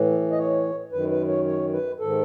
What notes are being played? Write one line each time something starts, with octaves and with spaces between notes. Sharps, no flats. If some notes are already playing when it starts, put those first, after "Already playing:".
Already playing: A2 E3
D#5
C#5
F#2 D#3 B4
B4
C#5
C#5
B4
G#2 D#3 A4